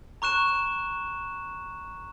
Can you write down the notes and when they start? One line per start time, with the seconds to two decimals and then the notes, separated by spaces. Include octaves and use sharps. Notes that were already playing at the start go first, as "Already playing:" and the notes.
0.22 A#5 C#6 F#6 E7